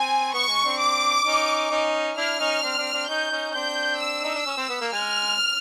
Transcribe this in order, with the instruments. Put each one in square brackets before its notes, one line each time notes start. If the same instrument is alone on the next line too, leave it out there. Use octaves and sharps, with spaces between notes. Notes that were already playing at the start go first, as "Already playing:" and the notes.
Already playing: [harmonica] C4 [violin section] G#5
[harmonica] B3 [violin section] C#6
[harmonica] G#3
C4 D4
[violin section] D6
[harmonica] C#4 D#4
C#4 D#4
[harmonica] D4 E4 [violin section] F6
[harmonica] C#4 D#4
C4 D4
C4 D4
C4 D4
[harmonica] C#4 D#4 [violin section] G6
[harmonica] C#4 D#4
C#4
[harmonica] C4 D4 [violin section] G6
[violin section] E6
[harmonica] D#4
D4
C#4
C4
B3
A#3
[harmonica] G#3 [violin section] F6